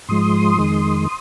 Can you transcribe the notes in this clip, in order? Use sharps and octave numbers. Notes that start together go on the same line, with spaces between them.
G#2 F3 G#3 C6 D#6
F2 D#3 G#3